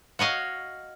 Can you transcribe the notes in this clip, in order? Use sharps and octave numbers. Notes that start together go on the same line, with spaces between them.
F#4 C#5 D#5 F5